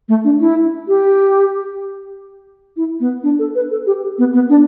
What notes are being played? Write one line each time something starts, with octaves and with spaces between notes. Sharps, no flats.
A3
D4
E4
G4
E4
B3
D4
A4
B4
A4
G4
B3
B3
D4